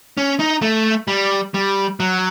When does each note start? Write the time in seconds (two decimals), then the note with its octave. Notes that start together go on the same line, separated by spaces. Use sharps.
0.17 C#4
0.39 D#4
0.62 A3
1.08 G3
1.54 G3
2.00 F#3